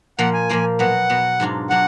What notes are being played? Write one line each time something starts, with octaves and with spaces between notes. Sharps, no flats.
A#2 F3 A#3 F4 F#5
G#5
A#2 F3 A#3 F4
B2 F#3 B3 F#5
B2 F#3 B3
G#2 F#3 D4 F4
F#3 D4 F4 F#5